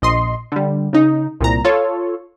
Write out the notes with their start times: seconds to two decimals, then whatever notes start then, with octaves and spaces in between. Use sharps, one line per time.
0.02 A#1 D#5 C6
0.52 D3 G3
0.93 C#3 D#4
1.41 C2 A#2 A#5
1.64 F4 A4 C#5